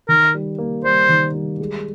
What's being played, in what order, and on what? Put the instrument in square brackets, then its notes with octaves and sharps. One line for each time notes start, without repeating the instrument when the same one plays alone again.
[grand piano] D#3 [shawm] A#4
[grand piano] G3
A#3
[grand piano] G3 [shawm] C5
[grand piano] D#3
G3
G#3